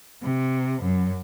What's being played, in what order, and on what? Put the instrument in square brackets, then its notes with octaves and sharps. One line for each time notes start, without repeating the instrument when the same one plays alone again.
[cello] C3
F#2